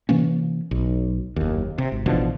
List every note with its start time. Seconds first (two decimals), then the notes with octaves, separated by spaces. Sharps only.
0.09 C3 E3 A#3 C#4
0.71 B1
1.36 F#1 D#2
1.78 C3
1.92 G#1
2.06 A1 B2 D3 F3